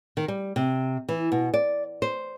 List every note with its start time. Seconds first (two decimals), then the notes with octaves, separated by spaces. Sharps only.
0.17 D#3
0.28 G3
0.56 C3
1.09 E3
1.32 B2
1.54 D5
2.02 C5